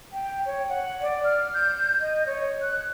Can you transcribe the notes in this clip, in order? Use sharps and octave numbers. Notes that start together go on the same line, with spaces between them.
G5
C#5
F#5
D5
F6
G6
D#5
C#5
F#6